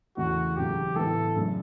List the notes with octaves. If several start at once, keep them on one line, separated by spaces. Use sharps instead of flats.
E2 C#3 E3 A3 F#4
E1 D2 C#3 F#3 G4
A1 A2 E3 B3 A4
F#2 C#3 F#3 A3 D4